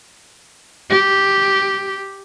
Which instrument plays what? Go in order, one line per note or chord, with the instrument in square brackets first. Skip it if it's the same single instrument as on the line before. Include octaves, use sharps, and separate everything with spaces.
[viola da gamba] G4